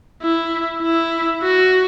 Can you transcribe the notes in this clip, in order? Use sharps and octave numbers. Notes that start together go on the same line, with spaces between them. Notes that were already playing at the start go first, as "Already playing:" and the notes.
E4
E4
F#4